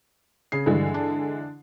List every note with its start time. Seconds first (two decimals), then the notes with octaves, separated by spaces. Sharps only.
0.52 C#3 G#4 C7
0.66 G2 D3 E3 G#3
0.94 D4